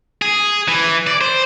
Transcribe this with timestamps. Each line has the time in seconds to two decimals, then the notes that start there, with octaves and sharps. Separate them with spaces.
0.22 G#4
0.68 E3
1.07 D5
1.21 C5